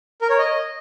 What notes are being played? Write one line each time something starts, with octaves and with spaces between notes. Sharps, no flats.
A#4
C#5
D#5